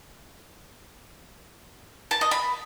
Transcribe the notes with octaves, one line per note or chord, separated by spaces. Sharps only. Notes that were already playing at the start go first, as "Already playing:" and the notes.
A5
D#5
B5